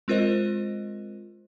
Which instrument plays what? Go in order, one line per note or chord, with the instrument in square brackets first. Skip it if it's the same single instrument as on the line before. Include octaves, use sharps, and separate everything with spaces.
[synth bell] G#3 C4 F4 A#4 C5 D#5